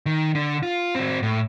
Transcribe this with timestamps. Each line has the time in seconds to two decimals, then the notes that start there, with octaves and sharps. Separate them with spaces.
0.06 D#3
0.35 D3
0.63 F4
0.95 C4 F#4
1.23 A2